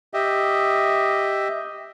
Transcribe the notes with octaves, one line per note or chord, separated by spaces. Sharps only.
G4 D#5 E5